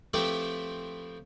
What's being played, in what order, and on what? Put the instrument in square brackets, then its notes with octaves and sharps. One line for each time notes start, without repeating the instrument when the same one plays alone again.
[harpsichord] F3 A3 C4 E4 G4 B4